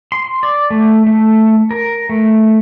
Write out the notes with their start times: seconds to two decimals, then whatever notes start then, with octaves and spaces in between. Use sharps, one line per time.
0.12 C6
0.43 D5
0.70 A3
1.07 A3
1.71 A#4
2.09 A3